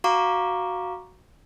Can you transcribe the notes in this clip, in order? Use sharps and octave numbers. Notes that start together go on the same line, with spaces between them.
F#4 F5 A#5 C#6 D6